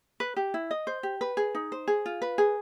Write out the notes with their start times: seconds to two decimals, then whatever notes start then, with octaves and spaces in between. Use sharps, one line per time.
0.20 B4
0.36 G4
0.54 E4
0.71 D#5
0.87 C5
1.03 G4
1.21 B4
1.37 G#4
1.55 D#4
1.72 C5
1.88 G#4
2.06 F4
2.22 B4
2.38 G#4